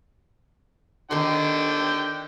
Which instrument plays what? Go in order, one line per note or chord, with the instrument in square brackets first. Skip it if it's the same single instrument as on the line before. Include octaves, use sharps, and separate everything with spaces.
[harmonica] D3 G5 [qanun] D#3 C6